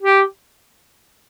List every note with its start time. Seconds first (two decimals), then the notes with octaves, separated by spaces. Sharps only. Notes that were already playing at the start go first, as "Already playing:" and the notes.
0.01 G4